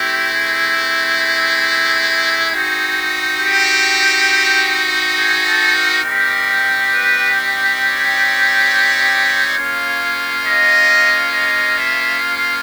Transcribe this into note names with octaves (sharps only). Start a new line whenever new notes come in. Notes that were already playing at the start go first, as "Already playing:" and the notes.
Already playing: A3 C4 E4 G4
G#4
G#4
C4 D#4 F#4
G4
G#4
A4
A#4
G3 C4 D#4 G4
B4
C#5
A#3 C#4 F4
D#5
D#5
E5
F5